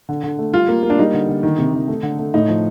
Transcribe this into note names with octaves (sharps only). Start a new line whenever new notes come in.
D3
D3
A3
G3 F4
A#3
A#3
D4
G3 D#4
D3
D3
D#3
C3
D#3
A3
D3
A3
A2 D#4
F3